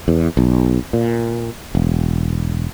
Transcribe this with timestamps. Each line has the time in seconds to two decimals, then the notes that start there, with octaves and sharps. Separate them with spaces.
0.08 E2
0.37 B1
0.93 A#2
1.75 E1